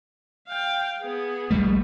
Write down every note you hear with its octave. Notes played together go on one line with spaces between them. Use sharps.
F5 G5
B3 G#4
A#1 G3 A3